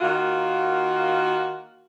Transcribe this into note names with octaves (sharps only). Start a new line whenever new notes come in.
D#3 A#3 F4 F#4